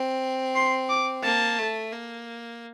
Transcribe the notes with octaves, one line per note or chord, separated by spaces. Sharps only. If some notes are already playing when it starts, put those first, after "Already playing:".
Already playing: C4
C6
D6
A#3 A5
A3
A#3